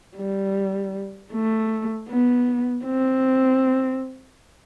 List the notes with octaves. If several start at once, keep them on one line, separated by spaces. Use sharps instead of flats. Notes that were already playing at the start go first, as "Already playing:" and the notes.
G3
A3
B3
C4